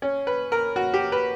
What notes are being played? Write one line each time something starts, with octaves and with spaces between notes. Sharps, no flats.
C#4
B4
A#4
F#4
G4
B4